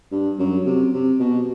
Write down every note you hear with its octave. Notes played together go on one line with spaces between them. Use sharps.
G2
F#2
C3
C3
B2